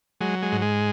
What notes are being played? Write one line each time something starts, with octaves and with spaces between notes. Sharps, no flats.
F#3 G#3
G#3
G#2
G#3